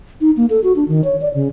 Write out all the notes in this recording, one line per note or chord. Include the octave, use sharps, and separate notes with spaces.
D#4
A#3
A4
F#4
D4
D#3
C#5
D5
C#3